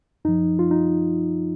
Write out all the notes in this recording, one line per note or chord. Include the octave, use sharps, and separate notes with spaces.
F#2 F3 D#4
F4
D#4